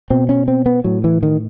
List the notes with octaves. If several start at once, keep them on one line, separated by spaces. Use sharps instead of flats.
B2 C4
C#4
C4
B3
A2 F#3
E3
D#3